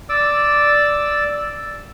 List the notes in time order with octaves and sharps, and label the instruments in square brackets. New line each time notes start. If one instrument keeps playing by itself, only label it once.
[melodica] D5 D6 E6